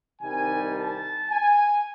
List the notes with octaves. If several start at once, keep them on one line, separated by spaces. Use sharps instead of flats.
C2 C3 D#3 G3 G#5
A5
G#5